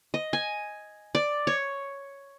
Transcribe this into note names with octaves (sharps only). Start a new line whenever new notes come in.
D#5
G#5
D5
C#5